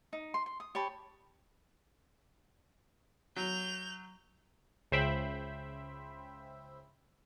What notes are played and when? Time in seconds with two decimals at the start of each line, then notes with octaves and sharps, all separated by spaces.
0.13 D#4
0.34 C6
0.46 C6
0.60 D#6
0.75 G4 C#5 A5 B5
3.36 F#3 G6 F7
4.92 C#2 C#3 C5 E5 G5 B5